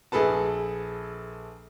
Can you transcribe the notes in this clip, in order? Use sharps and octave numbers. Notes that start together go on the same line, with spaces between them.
A#1 G#4 A4 B4 A5